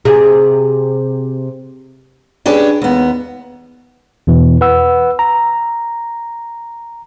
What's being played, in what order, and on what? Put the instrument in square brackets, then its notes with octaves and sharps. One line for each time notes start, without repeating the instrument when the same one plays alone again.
[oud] C3 G#4
[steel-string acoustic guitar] C#4 D4 G4 G#4 B4
D#2 B3
[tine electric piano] E2 B2 E3
B4 F#5 E6
A#5